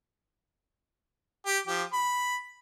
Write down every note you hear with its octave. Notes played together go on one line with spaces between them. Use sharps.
G4
F3 G4
B5